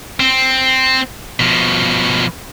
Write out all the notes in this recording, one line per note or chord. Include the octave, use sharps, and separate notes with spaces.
C4
B2 F3